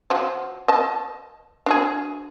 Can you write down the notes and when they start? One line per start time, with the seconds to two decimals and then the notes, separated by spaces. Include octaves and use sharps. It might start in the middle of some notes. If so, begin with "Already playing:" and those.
0.10 F3 F#3
0.68 D#5 A5
1.66 D4 F#4 G#4